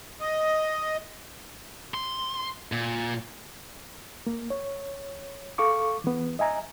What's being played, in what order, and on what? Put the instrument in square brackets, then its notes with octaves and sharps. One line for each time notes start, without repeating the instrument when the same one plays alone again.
[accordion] D#5
[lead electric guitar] C6
A#2
[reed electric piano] A#3
C#5
A4 F5 C#6 D6
E3 B3
D#5 E5 G#5 A#5